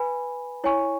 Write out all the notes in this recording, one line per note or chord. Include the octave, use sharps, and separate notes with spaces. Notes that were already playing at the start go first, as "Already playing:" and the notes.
Already playing: B4 G#5 B5
E4 C#5 G#5 C#6